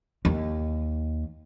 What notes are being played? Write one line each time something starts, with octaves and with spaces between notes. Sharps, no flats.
D#2